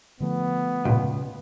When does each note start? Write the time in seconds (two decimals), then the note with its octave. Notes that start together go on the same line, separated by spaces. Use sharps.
0.20 D3 F3 A3 B3
0.85 C#2 G2 A#2